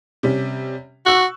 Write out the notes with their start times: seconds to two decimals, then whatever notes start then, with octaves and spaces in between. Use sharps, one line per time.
0.23 C3 G3 C#4
1.06 F#4 C#6 E6 F#6